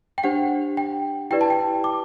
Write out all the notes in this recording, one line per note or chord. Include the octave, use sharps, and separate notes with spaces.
G5
D4 G4 C5 F#5
G5
E4 G4 B4 D5 G5
A5
G5
D6